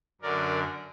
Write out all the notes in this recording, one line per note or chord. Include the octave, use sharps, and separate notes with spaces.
F#2 D3 A#4 D5